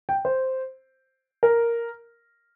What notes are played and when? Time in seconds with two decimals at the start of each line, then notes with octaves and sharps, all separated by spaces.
0.09 G5
0.25 C5
1.43 A#4